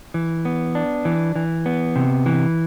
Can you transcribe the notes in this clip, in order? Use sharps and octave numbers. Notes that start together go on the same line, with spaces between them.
E3
B3
D4
E3
E3
B3
C3
E3